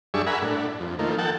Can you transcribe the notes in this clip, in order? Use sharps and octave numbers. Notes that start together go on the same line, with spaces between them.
F#2 G3 D4 G#4 E5 C#6
A#4 E5 F#5 G#5 B5
A2 D4
F2
D#3 F3 A3 A#3
A4 F#5 G5 A5